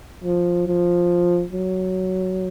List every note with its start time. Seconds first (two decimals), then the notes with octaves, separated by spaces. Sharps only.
0.24 F3
0.67 F3
1.52 F#3